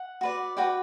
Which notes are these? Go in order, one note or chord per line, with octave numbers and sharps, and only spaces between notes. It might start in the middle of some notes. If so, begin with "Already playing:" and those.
Already playing: F#5
F#4 B4 D5
F#4 B4 D5 G5